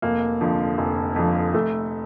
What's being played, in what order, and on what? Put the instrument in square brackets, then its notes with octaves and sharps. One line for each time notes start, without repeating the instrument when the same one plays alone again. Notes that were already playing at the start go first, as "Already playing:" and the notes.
[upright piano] F1 A#3
F2 D3 F3
F1
F2 D3 F3
F1 A3